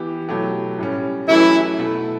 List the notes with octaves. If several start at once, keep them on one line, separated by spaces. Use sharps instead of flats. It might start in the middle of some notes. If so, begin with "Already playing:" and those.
Already playing: E3 B3 E4 G4
B2 F#3 A3 E4 G4
A2 G3 C#4
E3 F#3 A3 C#4 E4 G4
B2 A3 E4 A4